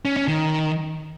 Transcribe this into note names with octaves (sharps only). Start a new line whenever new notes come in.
C#4
C#4
D#3